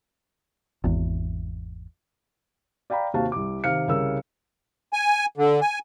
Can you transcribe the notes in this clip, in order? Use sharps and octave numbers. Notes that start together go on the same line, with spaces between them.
G#1 E2
D5 F5 G5 A#5 B5
D#2 C3 F#4 F5 A5
C2 D6
C3 D#3 F5 F6 C#7
C2 C#3 A#4 E6
G#5
D3
G#5